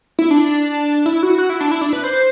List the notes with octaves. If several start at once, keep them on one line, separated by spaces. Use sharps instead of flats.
E4
D4
E4
F#4
F#4
E4
D4
E4
D4
B4
C5